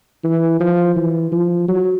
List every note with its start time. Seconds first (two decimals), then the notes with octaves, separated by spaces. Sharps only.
0.24 E3
0.61 F3
0.96 E3
1.32 F3
1.68 F#3